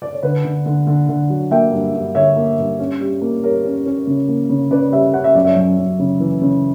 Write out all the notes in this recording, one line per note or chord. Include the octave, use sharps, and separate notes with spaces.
D5
C#5
D3 B4
D3
D3
D3
D3
F#3
A#3 E5 G5
G2
G2
D3 C#5 E5
A#3
G2
C#4
G3
A#3
G3 A#4 C#5
C#4
C#4
C#3
A#3
C#3
C#3 B4 D5
G3 C#5 E5
C#4 F#5
E5
F#2 D5
C#5 E5
F#2
F#2
C#3
E3
C#3